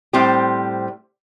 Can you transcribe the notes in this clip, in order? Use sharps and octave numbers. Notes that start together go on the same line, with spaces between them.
A2 G3 C4 G4 C5